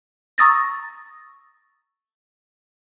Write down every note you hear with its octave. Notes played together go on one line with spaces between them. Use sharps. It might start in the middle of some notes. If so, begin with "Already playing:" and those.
A#5 C#6 D#6 E6 A6 A#6